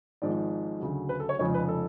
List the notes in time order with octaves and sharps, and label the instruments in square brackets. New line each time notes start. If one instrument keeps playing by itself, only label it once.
[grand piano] G#1 G#2 F3 G#3 D5
D2 C#3 F#3
B4
A4
C#5
F1 F2 C#3 F3 G#3 C#5
B4
A4